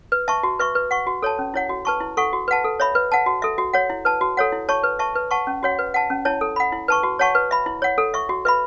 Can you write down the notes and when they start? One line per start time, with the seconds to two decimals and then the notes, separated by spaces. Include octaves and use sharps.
0.12 B4
0.28 E5 A5 C#6
0.43 F#4
0.59 B4 E5 C#6
0.75 B4
0.91 F#5 C#6
1.07 F#4
1.22 A4 C#5 A5
1.39 C#4
1.54 E4 C#5 F#5
1.69 F#4
1.85 B4 A5 C#6
2.01 E4
2.17 A4 F#5 C#6
2.33 F#4
2.48 B4 F#5 A5
2.64 A4
2.80 C#5 E5 B5
2.95 B4
3.12 F#5 A5
3.26 F#4
3.42 A4 E5
3.58 F#4
3.73 C#5 F#5
3.90 E4
4.05 B4 A5
4.21 F#4
4.37 A4 C#5 F#5
4.52 E4
4.69 C#5 A5 C#6
4.83 B4
4.99 E5 A5 C#6
5.15 B4
5.31 F#5 A5 C#6
5.47 C#4
5.63 F#4 C#5 F#5
5.79 B4
5.94 F#5 A5
6.10 C#4
6.25 E4 C#5 A5
6.41 A4
6.56 F#5 B5
6.72 E4
6.88 B4 A5 C#6
7.03 F#4
7.19 C#5 F#5 A5 C#6
7.35 B4
7.51 E5 B5
7.66 E4
7.82 C#5 F#5
7.98 A4
8.14 E5 C#6
8.29 F#4
8.45 B4 E5 B5